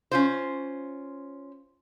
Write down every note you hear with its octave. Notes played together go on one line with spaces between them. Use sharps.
C#4 F4 C5